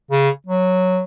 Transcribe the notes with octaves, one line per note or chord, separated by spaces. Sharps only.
C#3
F#3